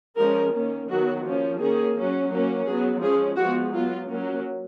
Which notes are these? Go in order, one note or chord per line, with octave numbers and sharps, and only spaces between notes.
F3 G#3 C#4 A#4
D#3 A#3 C#4
D#3 F#3 B3 F#4
F3 A#3 C#4
D#3 A#3 C#4 G#4
F#3 C#4
F#3 A#3 C#4
F#3 B3 G#4
F3 G#3 C#4 G#4
F3 G#3 B3 F#4
F#3 B3 F4
F#3 A#3 C#4